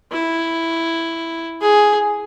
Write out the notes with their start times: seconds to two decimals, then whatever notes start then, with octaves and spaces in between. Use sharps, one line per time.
0.12 E4
1.61 G#4